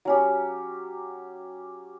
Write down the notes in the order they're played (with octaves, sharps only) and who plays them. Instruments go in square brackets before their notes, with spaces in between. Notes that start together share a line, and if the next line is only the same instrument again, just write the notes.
[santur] F#3 C#4 G4